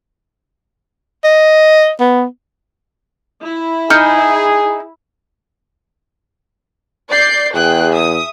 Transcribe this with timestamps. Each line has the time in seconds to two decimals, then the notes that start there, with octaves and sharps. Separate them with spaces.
1.24 D#5
2.00 B3
3.45 E4
3.90 D#4 G#4 F6 G6 C#7
7.10 D5 G6 C7
7.54 E2 G#4 G5 F#6
7.92 E5 D#6